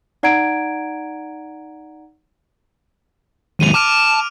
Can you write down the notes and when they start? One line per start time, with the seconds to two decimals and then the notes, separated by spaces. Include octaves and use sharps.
0.23 D#4 D5 F#5 A#5 G#6 D7
3.60 D#2 G#2 D#7 F7
3.74 A5 D6 F6 D7